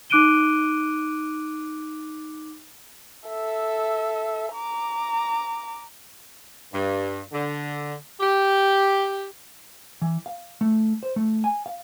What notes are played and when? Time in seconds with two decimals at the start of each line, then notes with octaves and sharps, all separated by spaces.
0.10 D#4 D6 F#6 D7 D#7 G7
3.28 A4 E5
4.54 A#5 D6
6.73 G2
7.32 D3
8.21 G4
10.02 E3
10.26 F5
10.61 A3
11.03 C5
11.16 A3
11.44 G#5
11.66 F5